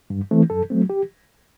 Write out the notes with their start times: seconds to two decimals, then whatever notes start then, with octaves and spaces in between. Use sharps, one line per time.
0.10 G2
0.31 E3 A3 C4
0.50 F#2 A4
0.70 F#3 A3 C4
0.90 G4